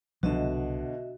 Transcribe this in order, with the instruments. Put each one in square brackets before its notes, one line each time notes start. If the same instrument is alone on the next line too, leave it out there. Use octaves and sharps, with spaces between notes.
[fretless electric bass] C2 F3 F#3 [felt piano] B2 D3 [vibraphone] F#4 D#5 E5